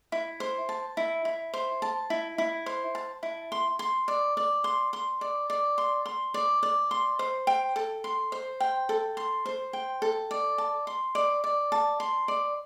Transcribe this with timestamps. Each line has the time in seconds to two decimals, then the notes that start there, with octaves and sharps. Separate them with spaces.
0.12 E4
0.40 C5
0.69 A5
0.97 E4
1.25 E4
1.54 C5
1.82 A5
2.10 E4
2.38 E4
2.66 C5
2.95 A5
3.23 E4
3.52 C6
3.79 C6
4.08 D5
4.37 D5
4.64 C6
4.93 C6
5.21 D5
5.50 D5
5.78 C6
6.06 C6
6.34 D5
6.63 D5
6.91 C6
7.19 C5
7.47 G5
7.76 A4
8.04 C6
8.32 C5
8.60 G5
8.89 A4
9.17 C6
9.46 C5
9.73 G5
10.02 A4
10.31 D5
10.58 A5
10.87 C6
11.15 D5
11.44 D5
11.72 A5
12.00 C6
12.28 D5